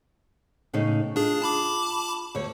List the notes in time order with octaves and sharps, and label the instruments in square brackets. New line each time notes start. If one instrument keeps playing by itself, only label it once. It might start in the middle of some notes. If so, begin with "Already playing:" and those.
[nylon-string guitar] A2 C#3 D#4
[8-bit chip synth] D4 G#4 [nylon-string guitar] F4
[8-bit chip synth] A5 B5 D6
[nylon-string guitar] D2 C#5